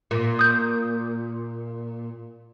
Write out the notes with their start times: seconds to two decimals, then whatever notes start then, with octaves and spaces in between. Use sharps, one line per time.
0.11 A#2
0.39 D#6 G6